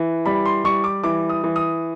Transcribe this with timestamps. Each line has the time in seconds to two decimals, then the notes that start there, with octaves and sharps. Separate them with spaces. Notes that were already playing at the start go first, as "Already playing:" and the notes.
Already playing: E3
0.26 G3 B5
0.46 C6
0.64 G3 C#6
0.84 D6
1.03 E3 D6
1.29 D#6
1.44 E3
1.56 D#6